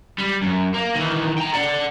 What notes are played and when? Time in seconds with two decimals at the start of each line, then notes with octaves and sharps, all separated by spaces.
0.18 G3
0.42 F#2
0.74 A#3
0.95 D#3 E3
1.38 G5 A#5
1.54 D5 F#5